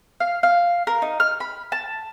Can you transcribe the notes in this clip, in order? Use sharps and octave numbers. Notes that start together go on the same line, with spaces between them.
F5
F5
A#4
D#4
F6
B5
A5